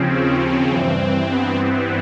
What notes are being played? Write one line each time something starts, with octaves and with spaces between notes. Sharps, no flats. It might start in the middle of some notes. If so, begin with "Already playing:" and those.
Already playing: D#2 C#3 F3 C4 C#4
C4
C4
G2 E3
B3
C4